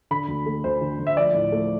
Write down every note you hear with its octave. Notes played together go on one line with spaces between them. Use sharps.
D3 B5
D2
A3
D2 C5
D3
D2
E5
F3 D5
A2
A3